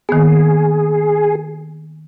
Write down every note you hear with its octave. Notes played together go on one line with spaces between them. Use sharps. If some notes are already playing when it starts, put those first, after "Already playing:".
D#3 A#3 B3 G#4